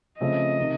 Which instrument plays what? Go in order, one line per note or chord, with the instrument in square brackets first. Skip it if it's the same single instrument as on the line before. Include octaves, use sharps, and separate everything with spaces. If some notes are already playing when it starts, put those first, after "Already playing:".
[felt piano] C#3 F3 A3 C4 [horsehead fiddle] D#5
[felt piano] C3 D#3